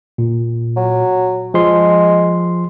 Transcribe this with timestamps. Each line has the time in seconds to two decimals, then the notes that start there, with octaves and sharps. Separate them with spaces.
0.18 A#2
0.76 F#3
1.54 F3 G#3 C6